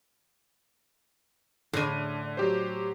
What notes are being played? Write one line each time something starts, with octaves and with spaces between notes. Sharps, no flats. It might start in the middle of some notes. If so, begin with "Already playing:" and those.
A2 D3 D4 D#7
F#3 G4 C5